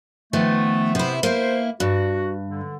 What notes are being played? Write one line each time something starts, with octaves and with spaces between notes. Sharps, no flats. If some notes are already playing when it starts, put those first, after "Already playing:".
D#3 F3 A3 B3
C3 B3 E4 C5
A#3 E4 C5
G2 F#4
D3